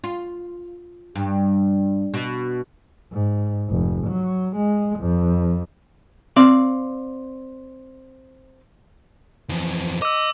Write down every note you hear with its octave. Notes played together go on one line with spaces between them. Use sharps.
F4
G2
B2
G#2
F1
F#3
G#3
F2
C4 D5 F5
F2 E3
D#5 D6 E6